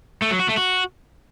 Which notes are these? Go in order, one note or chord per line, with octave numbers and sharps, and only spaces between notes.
A3
F#3
F#4
A3
F#4